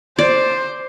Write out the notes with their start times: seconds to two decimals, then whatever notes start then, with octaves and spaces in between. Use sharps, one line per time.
0.19 C5 D5